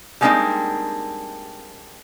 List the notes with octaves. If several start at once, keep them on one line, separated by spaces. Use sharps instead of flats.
G3 G#3 A#3 C4 D4 D#4